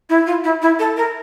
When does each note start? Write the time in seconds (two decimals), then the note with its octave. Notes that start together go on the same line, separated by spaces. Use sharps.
0.09 E4
0.26 F4
0.44 E4
0.62 E4
0.79 A4
0.96 A#4